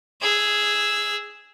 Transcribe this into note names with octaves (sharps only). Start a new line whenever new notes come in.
G#4 E6